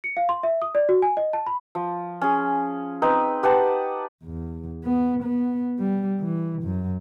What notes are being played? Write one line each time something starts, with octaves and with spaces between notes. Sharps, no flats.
C#7
F5
C6
E5
D#6
D5
F#4
G#5
D#5
A5
B5
F3
C#4 G#4
C4 D#4 B4
G4 B4 F#5 A5
E2
B3
B3
G3
E3
F#2